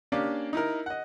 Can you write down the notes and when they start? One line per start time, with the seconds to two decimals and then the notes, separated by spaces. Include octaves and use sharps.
0.12 A#3 C#4 D4 G4 D5 F5
0.53 D#4 E4 A#4
0.86 D#5 F#5